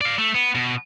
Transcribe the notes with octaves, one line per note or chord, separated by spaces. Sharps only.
D5 F5
A3
B3
B2